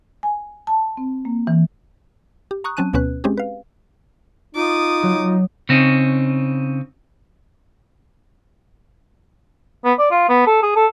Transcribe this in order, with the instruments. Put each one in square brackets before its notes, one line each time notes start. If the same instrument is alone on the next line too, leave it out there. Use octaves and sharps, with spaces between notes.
[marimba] G#5
A5
C4
A#3
E3
[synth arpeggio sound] G4
A#5 C#6 D#6 F#6
F#3 C4 C#4 A5 F#6 D#7
D2 B2 B3 C#4 B4 F#6
G#3 C4 C#4 G4 G#4
B4 F5
[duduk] D#4 [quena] F4 [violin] D6 D#6
[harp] F#3
[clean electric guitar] C#3 C4 C#4 D#4
[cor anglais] B3
D5
F4
B3
A4
G#4
A4